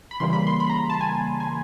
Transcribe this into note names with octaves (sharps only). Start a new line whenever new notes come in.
B5
C#3 E3 G3 A#3 C6
B5
C6
B5
A#5
A5
G#5
G#5